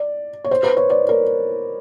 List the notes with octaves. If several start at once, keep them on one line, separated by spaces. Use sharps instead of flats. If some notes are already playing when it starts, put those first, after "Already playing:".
Already playing: D5
C#5
C5
B4
C#5
D5
A#4